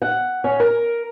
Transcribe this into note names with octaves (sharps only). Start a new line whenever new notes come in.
F#5
C#4
A#4